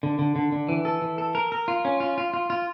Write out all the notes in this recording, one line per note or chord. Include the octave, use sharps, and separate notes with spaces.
D3
D3
D3
D3
E3
A4
E3
A4
A#4
A#4
F4
C#4
F4
F4
F4
F4